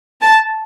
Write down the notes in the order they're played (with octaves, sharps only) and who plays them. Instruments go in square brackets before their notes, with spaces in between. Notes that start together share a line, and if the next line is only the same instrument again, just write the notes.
[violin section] A5